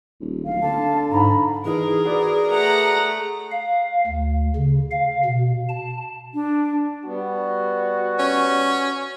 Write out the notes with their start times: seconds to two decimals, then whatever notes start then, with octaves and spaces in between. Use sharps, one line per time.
0.20 D#1
0.45 D1 F5
0.62 D3 A5
1.11 G#2 A#5 B5
1.65 E3 D#4 G#4 A#4
2.05 F#4 B4 D5
2.50 A3 F#5 A#5
3.52 F5
4.07 D2
4.56 C#3
4.91 F5
5.25 B2
5.68 A5
6.34 D4
7.05 G3 B3 F#4
8.19 C#4